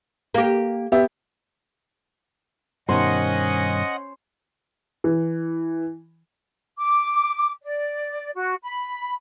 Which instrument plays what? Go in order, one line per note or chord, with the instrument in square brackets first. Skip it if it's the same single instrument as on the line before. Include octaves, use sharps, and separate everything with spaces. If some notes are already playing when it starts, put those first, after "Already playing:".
[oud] A#3 G4
[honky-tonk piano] B3 G4 E5
[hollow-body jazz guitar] G2 B2 D#3 [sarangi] C#4 [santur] C5 [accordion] D#5 F#5
[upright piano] E3
[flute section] D6
D5
F#4
B5